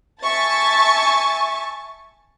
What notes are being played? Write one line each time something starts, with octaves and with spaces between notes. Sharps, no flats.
E5 G#5 A5 C#6 A6